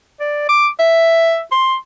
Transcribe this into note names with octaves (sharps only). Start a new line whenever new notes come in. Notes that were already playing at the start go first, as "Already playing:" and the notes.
D5
D6
E5
C6